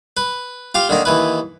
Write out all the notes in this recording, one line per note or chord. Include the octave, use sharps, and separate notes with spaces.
B4
F4 G4 F5
D3 D#3 A#3
D#2 E3 B4